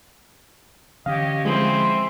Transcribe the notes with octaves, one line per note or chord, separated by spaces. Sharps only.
D3 E3 C#4 G4 C#5 D#5 F5
F3 G#3 C4 E4 C5 G#5